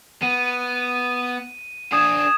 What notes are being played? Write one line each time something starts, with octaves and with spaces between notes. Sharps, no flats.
B3 D#7
D4 G#4 D#6 G#6 E7